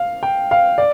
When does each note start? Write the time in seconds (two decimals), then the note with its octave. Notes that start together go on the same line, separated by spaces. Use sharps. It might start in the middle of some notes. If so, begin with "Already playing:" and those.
Already playing: F5
0.23 G5
0.51 F5
0.78 D5